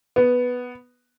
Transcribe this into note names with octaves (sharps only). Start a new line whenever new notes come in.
B3